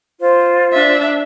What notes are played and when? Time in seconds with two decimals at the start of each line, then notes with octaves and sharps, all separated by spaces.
0.19 F4 C5
0.73 D4 E5